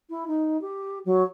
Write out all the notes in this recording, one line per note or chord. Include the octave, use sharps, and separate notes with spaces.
E4
D#4
G4
F#3